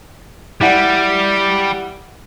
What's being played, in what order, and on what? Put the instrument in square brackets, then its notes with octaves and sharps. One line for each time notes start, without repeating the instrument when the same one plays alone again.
[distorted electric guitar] G3 [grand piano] E4 D5 F#5